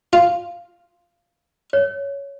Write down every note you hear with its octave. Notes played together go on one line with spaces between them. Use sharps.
F4
C#5